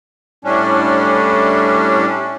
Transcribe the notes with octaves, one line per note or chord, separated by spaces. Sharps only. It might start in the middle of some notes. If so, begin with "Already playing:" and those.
A2 G3 C#4 D4